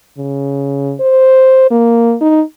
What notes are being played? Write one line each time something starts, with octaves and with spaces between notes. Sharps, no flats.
C#3
C5
A#3
D#4